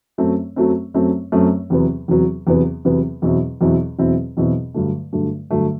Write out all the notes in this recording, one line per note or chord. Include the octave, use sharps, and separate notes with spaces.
F#2 F#3 A3 C4
F#2 F#3 A3 C4
F#2 F#3 A3 C4
F#2 F#3 A3 C4
E2 C3 F#3 B3
E2 C3 F#3 B3
E2 C3 F#3 B3
E2 C3 F#3 B3
E2 B2 F#3 C4 E4
E2 B2 F#3 C4 E4
E2 B2 F#3 C4 E4
E2 B2 F#3 C4 E4
G2 D3 F#3 A3
G2 D3 F#3 A3
G2 D3 F#3 A3